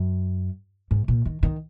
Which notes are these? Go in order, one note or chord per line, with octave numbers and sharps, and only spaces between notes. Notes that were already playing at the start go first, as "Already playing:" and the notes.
Already playing: F#2
G#2
A#2
D#3
D#3